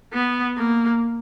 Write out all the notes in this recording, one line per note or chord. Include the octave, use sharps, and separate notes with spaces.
B3
A#3